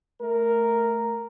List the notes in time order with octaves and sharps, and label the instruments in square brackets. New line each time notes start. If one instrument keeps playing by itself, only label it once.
[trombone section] A3 A#4